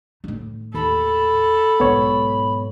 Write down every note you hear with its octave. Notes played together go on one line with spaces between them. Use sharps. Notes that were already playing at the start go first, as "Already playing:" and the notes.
A2 D#3
D#2 A4 B5
B1 G#2 B3 C#5